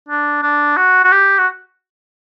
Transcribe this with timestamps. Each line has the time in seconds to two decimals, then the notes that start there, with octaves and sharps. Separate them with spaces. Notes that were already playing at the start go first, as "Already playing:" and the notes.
0.09 D4
0.42 D4
0.77 F#4
1.04 F#4
1.12 G4
1.38 F#4